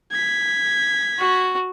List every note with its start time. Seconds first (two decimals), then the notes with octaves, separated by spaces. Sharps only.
0.11 G#6 B6
1.19 F#4